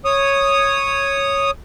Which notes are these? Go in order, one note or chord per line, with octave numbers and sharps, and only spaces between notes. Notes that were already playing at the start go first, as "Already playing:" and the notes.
C#5 D#6